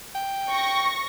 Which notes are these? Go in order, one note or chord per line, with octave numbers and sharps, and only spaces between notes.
G5
C#6 A#6